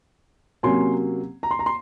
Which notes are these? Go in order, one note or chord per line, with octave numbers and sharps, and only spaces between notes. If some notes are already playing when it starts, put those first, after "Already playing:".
C3 F#3 A#3 C#4 G#5 C6
A#5
C6
A#5
C6